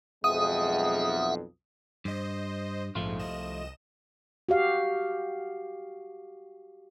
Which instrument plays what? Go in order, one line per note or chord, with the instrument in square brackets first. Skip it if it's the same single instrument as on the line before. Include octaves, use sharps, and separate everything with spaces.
[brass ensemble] B1 F2 [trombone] G#3 [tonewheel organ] E5 F#5 [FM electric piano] D#6
[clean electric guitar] G2 [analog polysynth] C5 D#5
[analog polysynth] A#1 F2 G#2 [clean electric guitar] F3 A3 F4
[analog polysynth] C2 D#5 E7
[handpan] F#4 G4 F5